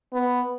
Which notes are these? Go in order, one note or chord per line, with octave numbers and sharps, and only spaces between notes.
B3